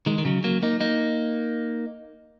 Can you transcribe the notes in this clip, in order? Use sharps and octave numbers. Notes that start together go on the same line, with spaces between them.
D#3 G#3
D#3
C#3 F#3
F#3 A#3
A#3 D#4
A#3 D#4